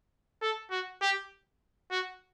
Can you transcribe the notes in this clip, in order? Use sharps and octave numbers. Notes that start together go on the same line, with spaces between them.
A4
F#4
G4
F#4